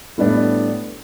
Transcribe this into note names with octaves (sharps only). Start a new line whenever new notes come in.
A2 G3 B3 D4